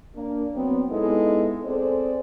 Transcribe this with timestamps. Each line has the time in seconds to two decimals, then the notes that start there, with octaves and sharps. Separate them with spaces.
0.15 A#3 D4
0.55 F#3 B3 C4
0.90 G#3 B3 D#4 E4 A4
1.65 C4 G#4 A4 C5 D5